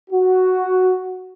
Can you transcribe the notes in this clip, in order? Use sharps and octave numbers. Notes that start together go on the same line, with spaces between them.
F#4